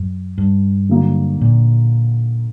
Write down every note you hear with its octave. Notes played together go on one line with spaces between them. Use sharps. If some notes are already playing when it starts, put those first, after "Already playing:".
Already playing: F#2
G2
D3 F#3 A#3
A#2